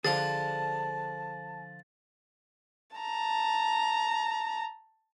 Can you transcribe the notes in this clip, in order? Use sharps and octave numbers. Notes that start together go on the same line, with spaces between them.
D3 F3 G#4 A4 D5 A5 A6
A5 A#5